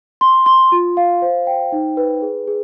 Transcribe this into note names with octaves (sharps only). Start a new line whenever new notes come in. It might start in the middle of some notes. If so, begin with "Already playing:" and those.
C6
C6
F4
F5
C5
G5
D#4
B4
G#4
G#4